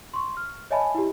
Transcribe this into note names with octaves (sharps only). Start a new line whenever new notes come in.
C6 C#6
F6
C#5 D#5 E5 G#5 A5 B5
E4 G4